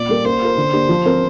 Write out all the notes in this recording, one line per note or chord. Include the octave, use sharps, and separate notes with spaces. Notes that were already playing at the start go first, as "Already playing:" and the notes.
Already playing: A#2 D5
G3 A#3 G4 A#4
A#3 C5
F4 A#4
D3
A#3 D4 G4
F3
C4 A#4